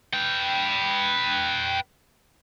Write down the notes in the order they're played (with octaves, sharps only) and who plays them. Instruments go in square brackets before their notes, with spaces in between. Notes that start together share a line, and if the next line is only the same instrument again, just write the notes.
[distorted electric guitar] B4 G5